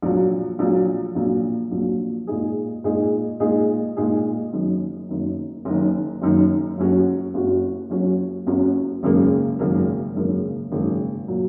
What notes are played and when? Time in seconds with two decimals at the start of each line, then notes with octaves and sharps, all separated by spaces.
0.02 A#1 A#2 F#3
0.59 A#1 A#2 F#3
1.15 A#1 A#2 F#3
1.71 A#1 A#2 F#3
2.27 A#2 G#3 D#4 G#4
2.84 A#2 G#3 D#4 G#4
3.40 A#2 G#3 D#4 G#4
3.97 A#2 G#3 D#4 G#4
4.53 F#1 F#2 D#3
5.09 F#1 F#2 D#3
5.65 F#1 F#2 D#3
6.22 F#1 F#2 D#3
6.78 F#1 F#2 F#3 C#4 F#4
7.34 F#1 F#2 F#3 C#4 F#4
7.90 F#1 F#2 F#3 C#4 F#4
8.47 F#1 F#2 F#3 C#4 F#4
9.03 G#1 F#2 C#3 A#3
9.59 G#1 F#2 C#3 A#3
10.15 G#1 F#2 C#3 A#3
10.72 G#1 F#2 C#3 A#3
11.28 A#2 F#3